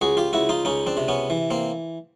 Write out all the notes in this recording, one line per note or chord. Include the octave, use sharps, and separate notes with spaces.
C#2 F#4 G#4
F4 G4
C#2 E4 F#4
D#4 F4
C#2 C#4 D#4
C4 D4
C3
B3 C#4
E3
A#3 C4